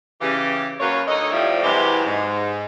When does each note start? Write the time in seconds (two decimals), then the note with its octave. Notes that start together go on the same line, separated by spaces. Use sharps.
0.20 C#3 E3 G4
0.80 F#2 F#3 A#3 B4 C#5
1.08 D2 D#4 A4 C#5 D#5
1.31 A2 C3 F3 G3 C4 E4
1.63 C3 E3 F#3 G#3 E4 G4
2.05 G#2